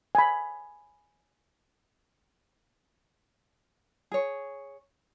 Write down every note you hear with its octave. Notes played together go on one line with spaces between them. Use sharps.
G#5 B5
G#4 C#5